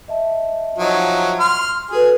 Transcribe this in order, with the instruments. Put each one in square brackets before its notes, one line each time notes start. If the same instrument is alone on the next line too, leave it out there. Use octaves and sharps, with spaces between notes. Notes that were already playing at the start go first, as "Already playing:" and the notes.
[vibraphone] D#5 E5 A5
[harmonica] F3 F#3 D#4
C6 F6
[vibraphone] F#4 A4 B4 [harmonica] G#4